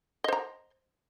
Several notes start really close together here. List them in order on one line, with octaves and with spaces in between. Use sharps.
D#5 C5 A#5